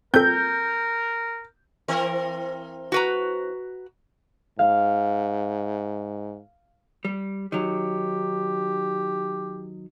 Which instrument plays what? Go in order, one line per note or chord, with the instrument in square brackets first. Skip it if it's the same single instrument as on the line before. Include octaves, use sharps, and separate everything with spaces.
[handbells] C4 A4 [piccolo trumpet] A#4 [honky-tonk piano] G6
[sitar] E3 C4 A#4
[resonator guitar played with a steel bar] F#4 B4 A#5
[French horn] G#2 [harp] F5
[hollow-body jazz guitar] G3
[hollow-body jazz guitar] D#3 F#3 [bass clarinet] G4